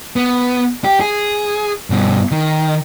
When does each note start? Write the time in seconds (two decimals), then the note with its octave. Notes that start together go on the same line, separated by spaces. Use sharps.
0.16 B3
0.85 G4
1.00 G#4
1.90 G2 B2
2.31 D#3